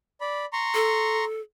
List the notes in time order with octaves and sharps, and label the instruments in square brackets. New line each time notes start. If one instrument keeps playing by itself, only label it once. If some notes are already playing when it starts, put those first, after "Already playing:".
[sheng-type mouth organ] D5 B5
A#5 C6 C#6
[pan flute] A4